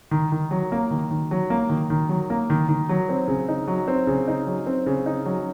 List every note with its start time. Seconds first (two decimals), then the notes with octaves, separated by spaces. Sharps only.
0.11 D#3
0.32 D#3
0.51 F#3
0.72 A#3
0.91 D#3
1.11 D#3
1.31 F#3
1.50 A#3
1.69 D#3
1.90 D#3
2.09 F#3
2.30 A#3
2.50 D#3
2.69 D#3
2.89 F#3
3.09 C4
3.28 C#3
3.49 D#4
3.68 F#3
3.88 C4
4.07 C#3
4.28 D#4
4.47 F#3
4.66 C4
4.86 C#3
5.06 D#4
5.26 F#3